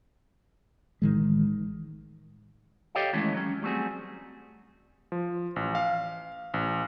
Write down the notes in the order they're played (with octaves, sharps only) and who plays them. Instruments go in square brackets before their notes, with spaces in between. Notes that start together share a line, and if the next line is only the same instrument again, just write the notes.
[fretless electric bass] A1 D#3 G#3
[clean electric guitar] G4 A4 C#5 D#5 F5 G5
D#3 E3 G#3 A3 C#4 E4
F#3 C#4
G3 A3 C4 F#4 G#4
[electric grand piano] F3
A1
F5
A1